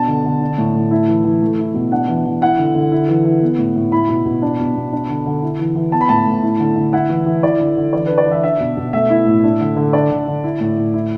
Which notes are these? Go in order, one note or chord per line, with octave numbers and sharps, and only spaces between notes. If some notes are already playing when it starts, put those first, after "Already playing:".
Already playing: B2 D4 A5
D3
D3
D4
A2
A2
E4
E3
E3
A3
E4
B2
D4 F#5
E3
E3
E4 F#5
D3
D3
E4
E3
E3
B3
A2
A2
E4 B5
B2
B2
D4
B2
B2
D4
D3
D3
E4
E3
E3
B3 A5
B5
A2 A5
A2
E4
D3
D3
E4 F#5
E3
E3
E4 D5
D3
D3
E3 D5
D4 B4
D5
E3
E5
D4 E5
B2
B2
A3 E5
E4
A2
D4
D3
D3
D4 D5
D3
D3
E4
A2
A2
E4